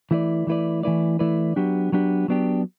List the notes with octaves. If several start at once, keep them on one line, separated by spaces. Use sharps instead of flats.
E3 A3 E4 B4 D5
E3 A3 E4 B4 D5
E3 A3 E4 B4 D5
E3 A3 E4 B4 D5
F#3 B3 D4 G4
F#3 B3 D4 G4
F#3 B3 D4 G4